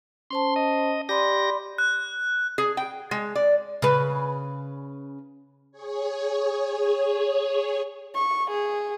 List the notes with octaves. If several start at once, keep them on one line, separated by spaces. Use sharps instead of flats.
C#4 C5 A5 C6
D#5
G4 D5 B5 C6 A#6
F#6
G#4
G5
G#3
D5
C#3 B4
G#4 C#5
C#6
G#4